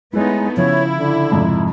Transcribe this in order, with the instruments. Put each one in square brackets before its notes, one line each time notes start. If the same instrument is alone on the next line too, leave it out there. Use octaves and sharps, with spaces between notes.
[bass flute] G#3 [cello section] A3 B3 D#4 [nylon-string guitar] E4 B4 C#5
[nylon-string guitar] C#3 F3 [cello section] E4 [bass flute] C#5
[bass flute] D3
[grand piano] F2 G#2 C3